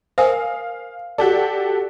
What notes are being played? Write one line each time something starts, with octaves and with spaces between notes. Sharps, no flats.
A#4 C5 F5 G#5 D#6
F#4 G4 A4 D5